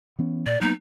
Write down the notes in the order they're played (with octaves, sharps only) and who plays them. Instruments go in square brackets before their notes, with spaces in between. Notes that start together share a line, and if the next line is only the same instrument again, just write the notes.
[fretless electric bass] E3 B3 C#4
[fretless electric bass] A#2 [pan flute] D5
[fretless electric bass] F#3 A#3 B3 [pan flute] D#4